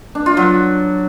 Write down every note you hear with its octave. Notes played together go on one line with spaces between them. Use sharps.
D4
F4
F#3